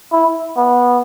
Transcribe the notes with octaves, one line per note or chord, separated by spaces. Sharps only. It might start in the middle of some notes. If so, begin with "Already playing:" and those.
E4
B3